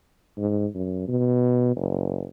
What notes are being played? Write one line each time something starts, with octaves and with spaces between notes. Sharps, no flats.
G#2
F#2
B2
F#1